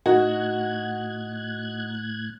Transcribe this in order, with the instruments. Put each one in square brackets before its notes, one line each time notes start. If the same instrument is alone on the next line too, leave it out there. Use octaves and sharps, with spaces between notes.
[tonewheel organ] A2 F#6 G#6 [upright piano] D#4 [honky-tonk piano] F#4